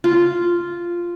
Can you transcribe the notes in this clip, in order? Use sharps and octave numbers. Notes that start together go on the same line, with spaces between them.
F4